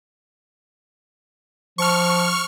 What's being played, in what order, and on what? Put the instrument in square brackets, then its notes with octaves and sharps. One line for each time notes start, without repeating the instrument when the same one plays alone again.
[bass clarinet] F3 [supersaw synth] C#6 F6